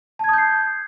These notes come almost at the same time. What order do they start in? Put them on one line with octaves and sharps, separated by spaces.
A5 G#6 D#6 G6 C7